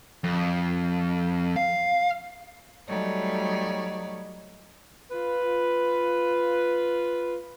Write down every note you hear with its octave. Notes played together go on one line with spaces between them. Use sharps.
F2
F5
F#3 G3 A3 D#4 C#5 D5
F4 B4